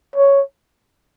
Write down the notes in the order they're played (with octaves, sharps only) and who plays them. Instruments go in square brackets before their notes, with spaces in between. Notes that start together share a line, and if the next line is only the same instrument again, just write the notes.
[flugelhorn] C#5